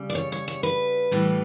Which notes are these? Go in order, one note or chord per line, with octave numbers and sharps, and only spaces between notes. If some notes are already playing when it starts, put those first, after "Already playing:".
Already playing: C#3 G3
D5
C#5
C#5
C#5
B4
A2 E3 G3